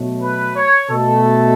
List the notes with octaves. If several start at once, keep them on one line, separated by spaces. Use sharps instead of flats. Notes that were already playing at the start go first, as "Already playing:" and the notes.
Already playing: B2 F#3 A3
B4
C#5
B2 A3 A4